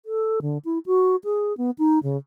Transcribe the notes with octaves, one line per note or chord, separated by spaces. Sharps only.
A4
D3
E4
F#4
G#4
B3
D#4
C#3